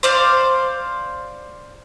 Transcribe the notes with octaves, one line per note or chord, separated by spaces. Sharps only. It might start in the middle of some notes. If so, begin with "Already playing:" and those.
C5 D5 F5